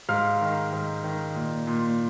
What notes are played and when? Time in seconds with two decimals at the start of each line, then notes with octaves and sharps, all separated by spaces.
0.09 G#2 F5 F6
0.41 D#3
0.72 G#2
1.04 D#3
1.35 A#2
1.67 A#2